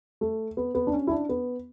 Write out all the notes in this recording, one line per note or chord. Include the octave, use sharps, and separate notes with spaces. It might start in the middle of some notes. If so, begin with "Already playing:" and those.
A3
B3
B3
D4
C#4
E4
D4
B3